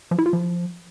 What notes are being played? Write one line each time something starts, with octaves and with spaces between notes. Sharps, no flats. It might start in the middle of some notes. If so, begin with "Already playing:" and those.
F3
E4
F4
F3